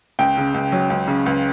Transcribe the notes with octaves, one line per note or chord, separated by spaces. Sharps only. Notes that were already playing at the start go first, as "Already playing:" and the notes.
C#2 G5
C#3
C#2
F#3
C#2
C#3
C#2